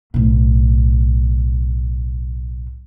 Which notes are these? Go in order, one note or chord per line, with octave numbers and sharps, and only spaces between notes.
B1 A2